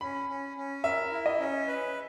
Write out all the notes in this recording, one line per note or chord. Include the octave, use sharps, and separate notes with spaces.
C#4 B5
C#4
C#4
A#4 E5
E4
D#5
C#4
B4